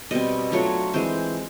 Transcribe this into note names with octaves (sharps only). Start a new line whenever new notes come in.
B2 G3 C4 D#5
F#3 A3 D4 F4 C#5
E3 G#3 C4 C5